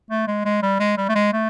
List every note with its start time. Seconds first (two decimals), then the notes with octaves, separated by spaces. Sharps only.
0.10 A3
0.28 G#3
0.45 G#3
0.63 G3
0.80 G#3
0.97 G3
1.09 A3
1.15 G#3
1.33 A3